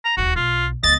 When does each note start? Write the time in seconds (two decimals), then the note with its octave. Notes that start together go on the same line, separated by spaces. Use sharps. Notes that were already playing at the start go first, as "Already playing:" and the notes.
0.05 A#5
0.17 D1 D#2 F#4
0.36 B1 F4
0.83 C#2 B3 D#5 A6